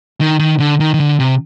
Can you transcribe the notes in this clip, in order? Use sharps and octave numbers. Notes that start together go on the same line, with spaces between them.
D#3
D#3
D3
D#3
D#3
D3
C3